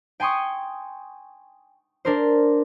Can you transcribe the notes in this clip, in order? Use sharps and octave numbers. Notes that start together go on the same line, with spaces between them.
G5 G#5 C6 C#6 D#6
D4 A#4 C5